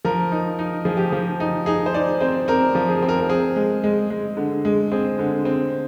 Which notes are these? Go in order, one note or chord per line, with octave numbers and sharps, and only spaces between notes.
F3 A#4
D#4
D#4
F3 G#4
G4
F3 G#4
D#4
D#4 G#4
C5
D#4 D5
C4 C5
C4 A#4
F3
G#4
C4
A#4
A#4
C4 G#4
G#3
G#3
G#3
D3
G#3
C4 G#4
D3
C4